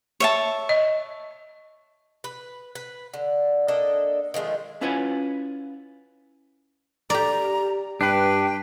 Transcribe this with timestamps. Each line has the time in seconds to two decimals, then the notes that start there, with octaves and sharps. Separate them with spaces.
0.20 C#5 E5 A5
0.69 D#5
2.24 B4
2.75 B4
3.14 D3
3.68 A#3 D4 A4 D#5
4.34 D#3 F3 G#3 A3
4.81 C#4 E4 F4 B4 F#5 G#5
7.10 G4 D5 A#5
8.01 G2 D4 B4 G5